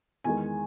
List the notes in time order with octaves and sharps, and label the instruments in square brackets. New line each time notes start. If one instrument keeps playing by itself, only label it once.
[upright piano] E2 D#3 G#3 G#5